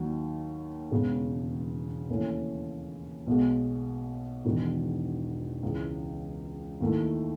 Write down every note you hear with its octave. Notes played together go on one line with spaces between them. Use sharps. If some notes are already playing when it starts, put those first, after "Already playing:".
Already playing: D#2 D#3 F#3
E1 E2 C#3 G#3 B3
D#2 C#3 E3 A3 C#4
B1 B2 G#3
E1 E2 D#3
C#2 C#3 E3
D#2 D#3 A3 E4